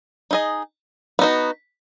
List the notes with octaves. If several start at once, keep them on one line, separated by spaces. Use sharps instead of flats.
D#4 G#4 D#5
B3 D#4 F#4